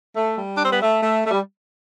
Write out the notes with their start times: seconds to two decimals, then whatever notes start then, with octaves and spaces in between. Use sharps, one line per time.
0.15 A3
0.37 G3
0.58 D4
0.65 C4
0.72 B3
0.81 A3
1.03 A3
1.24 A3
1.31 G3